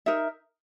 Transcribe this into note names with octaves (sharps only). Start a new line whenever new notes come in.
D#4 A#4 E5